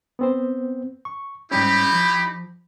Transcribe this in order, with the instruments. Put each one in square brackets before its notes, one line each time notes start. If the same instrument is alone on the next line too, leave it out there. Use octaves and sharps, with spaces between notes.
[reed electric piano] B3 C4 C5
C#6
[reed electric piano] G#2 G3 C#4 [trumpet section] D#4 E4 G4 [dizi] B5
[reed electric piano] F3